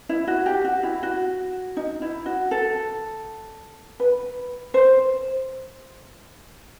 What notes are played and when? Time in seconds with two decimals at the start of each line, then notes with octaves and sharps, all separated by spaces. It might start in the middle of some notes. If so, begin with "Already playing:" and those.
0.09 E4
0.27 F#4
0.46 G4
0.65 F#4
0.83 E4
1.03 F#4
1.77 D#4
2.02 E4
2.26 F#4
2.51 A4
4.00 B4
4.74 C5